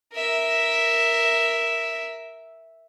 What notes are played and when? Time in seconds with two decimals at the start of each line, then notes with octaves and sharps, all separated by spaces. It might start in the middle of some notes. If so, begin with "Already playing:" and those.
0.13 A#4 E5